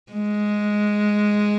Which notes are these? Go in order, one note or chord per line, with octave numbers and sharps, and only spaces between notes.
G#3